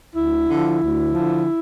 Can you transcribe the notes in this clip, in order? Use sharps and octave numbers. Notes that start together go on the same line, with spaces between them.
D2 E4
D3 F3
D2
D3 F3